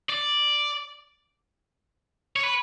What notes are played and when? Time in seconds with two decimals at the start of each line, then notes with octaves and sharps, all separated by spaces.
0.10 D5
2.36 C#5
2.43 B4